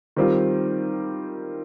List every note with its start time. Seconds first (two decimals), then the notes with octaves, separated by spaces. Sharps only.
0.16 D#3 G3 C4 F4